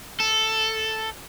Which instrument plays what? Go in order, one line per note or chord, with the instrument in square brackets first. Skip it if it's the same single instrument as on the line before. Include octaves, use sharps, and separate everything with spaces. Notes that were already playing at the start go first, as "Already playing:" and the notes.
[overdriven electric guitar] A4